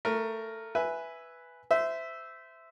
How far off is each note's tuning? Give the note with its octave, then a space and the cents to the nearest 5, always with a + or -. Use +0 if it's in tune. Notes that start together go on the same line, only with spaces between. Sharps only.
A3 +15 A#4 +0
B4 +0 E5 +0 G#5 +0
C5 -25 E5 +0